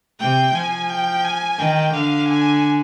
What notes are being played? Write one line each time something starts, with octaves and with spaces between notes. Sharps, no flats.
C3 G5
F3 G#5
G5
G#5
D#3 G5
D3 F5
G#5